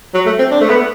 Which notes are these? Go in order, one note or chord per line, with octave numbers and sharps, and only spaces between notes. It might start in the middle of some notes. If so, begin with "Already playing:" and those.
F#3
A3
C4
D4
A3
B3